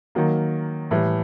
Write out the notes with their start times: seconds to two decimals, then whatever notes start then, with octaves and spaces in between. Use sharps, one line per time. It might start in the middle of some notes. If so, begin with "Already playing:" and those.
0.15 D#3 F#3 A#3
0.91 A2 E3 G3